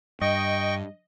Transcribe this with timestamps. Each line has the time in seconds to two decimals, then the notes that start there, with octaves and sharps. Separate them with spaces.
0.21 G2 D#5 G5 C#6